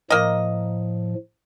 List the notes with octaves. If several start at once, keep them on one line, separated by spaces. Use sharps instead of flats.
A2 F3 A#3 D#5